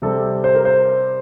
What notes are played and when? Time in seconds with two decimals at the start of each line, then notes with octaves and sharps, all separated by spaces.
0.02 C3 G3 C4 A4
0.44 C5
0.55 A#4
0.65 C5